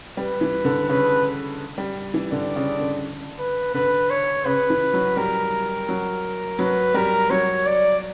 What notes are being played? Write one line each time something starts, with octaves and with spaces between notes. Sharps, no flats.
G3 B4
E3
D3
C#3 B4
G3
E3
D3 D5
C#3
D3
B4
D3 B4
C#5
C#3 B4
E3
F#3
G3 A#4
F#3
F#3 B4
G3 A#4
F#3 C#5
D5